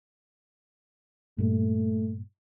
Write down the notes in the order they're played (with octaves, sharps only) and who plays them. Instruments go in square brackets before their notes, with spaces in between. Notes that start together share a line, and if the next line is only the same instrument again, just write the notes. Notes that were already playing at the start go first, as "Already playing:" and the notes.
[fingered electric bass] G2 A#2 [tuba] A3